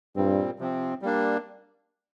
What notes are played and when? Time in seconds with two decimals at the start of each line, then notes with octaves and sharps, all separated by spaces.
0.16 G2 A#2 G3 C4
0.59 C3 F3 C4
1.02 G3 A#3 D4